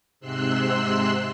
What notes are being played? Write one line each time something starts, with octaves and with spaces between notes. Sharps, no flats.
G#2 C3 C6 E6 F#6